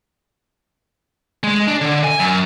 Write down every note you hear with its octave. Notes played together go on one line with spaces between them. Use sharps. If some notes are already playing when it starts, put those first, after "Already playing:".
G#3
D4
D3
G#5
F#2